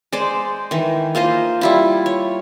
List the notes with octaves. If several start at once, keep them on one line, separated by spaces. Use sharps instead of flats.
G#3 C5 D5
D#3 E3
A#3 F4 C5 D#5
G3 E4 F4
C#5